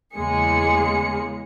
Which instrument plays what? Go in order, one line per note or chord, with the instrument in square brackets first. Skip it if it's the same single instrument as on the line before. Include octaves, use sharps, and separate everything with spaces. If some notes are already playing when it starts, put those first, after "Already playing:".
[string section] E2 C#3 G#3 A#3 G#4 C#7